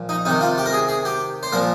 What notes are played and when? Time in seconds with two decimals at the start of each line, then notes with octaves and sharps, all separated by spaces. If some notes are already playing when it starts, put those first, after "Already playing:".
Already playing: A#2 F3
0.09 D#4
0.25 C3 D#3 D#4
0.41 F4
0.58 G4
0.66 A#4
0.73 G#4
0.89 G#4
1.05 G4
1.43 C5
1.52 A#2 F3 A#4